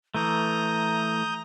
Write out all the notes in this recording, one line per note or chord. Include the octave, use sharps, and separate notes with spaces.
E3 A3 A#5 D#6 G6